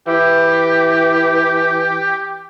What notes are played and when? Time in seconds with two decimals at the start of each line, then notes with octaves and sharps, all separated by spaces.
0.07 E3 G4